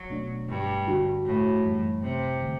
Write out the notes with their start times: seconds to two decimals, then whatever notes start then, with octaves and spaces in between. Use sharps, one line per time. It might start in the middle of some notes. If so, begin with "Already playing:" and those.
Already playing: F#3
0.10 B2 A3 D4
0.49 G2
0.87 D3 G3 D4 F#4
1.25 A2
1.64 F#2 E3 G3
2.02 C3
2.41 D3 A3